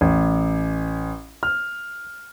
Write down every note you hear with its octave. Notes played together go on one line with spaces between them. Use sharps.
A1
F6